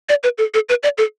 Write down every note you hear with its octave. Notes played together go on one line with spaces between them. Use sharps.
D5
B4
A4
A4
B4
D5
A4